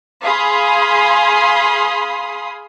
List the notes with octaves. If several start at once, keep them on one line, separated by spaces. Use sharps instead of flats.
G#4 F5 B5 C6 D#6